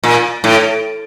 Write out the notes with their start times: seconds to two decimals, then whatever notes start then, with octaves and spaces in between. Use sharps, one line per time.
0.04 A#2
0.44 A2